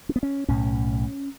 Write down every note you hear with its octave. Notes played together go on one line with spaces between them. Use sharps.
C#4
B3
C#4
B1 A2 C#4